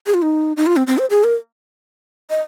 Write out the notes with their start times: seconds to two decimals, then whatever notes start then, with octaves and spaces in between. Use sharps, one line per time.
0.06 G#4
0.14 F4
0.22 D#4
0.57 D#4
0.67 F4
0.76 C4
0.87 C4
0.98 C5
1.10 G#4
1.24 A#4
2.30 D#5